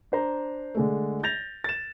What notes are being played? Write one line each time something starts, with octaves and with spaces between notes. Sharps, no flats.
D4 C5 A#5
D3 G#3 A3
G6 A6 A#6 F7
A6 E7